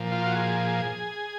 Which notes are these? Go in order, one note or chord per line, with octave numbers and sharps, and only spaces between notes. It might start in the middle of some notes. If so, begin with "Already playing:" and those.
Already playing: A#2 F3
F4
F#4
G#4